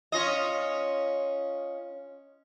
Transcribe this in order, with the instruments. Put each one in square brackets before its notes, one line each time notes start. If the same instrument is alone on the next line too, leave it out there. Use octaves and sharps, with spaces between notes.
[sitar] C#4 F4 D#5